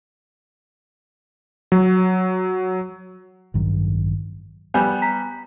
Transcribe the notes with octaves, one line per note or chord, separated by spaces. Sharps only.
F#3
A1 G2 D#3 F#3
G3 B3 G#5
A#5 B6